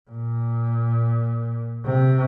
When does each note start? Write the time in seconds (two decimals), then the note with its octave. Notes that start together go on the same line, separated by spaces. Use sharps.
0.11 A#2
1.85 C3